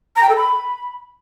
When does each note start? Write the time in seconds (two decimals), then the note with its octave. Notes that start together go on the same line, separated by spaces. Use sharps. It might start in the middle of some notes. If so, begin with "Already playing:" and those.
0.16 A#5
0.23 G5
0.29 A4
0.36 B5